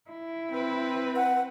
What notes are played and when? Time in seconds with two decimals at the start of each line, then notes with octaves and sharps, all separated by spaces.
0.10 E4
0.51 C4 B4
1.16 F#5